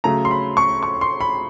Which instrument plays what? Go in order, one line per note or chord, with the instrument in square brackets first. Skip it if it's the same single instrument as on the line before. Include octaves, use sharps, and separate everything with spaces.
[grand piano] C#3 F#3 A3 A#5
C6
B5
C#6
C#6
C6
B5